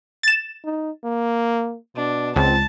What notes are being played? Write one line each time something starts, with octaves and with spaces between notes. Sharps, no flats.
A6 E7
D#4
A#3
B2 D4
C#2 C4 A5